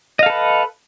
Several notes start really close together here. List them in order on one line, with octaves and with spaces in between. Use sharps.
D#5 F5 A4 B4